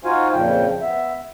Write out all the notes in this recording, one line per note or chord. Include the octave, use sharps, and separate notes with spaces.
D#4 F4 F#4 C5 F5 G#5
F2 A#2 C#3 F3 G5
B3 E5